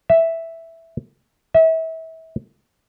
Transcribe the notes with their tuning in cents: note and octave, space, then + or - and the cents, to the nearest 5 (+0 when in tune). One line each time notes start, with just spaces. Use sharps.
E5 +0
E5 -30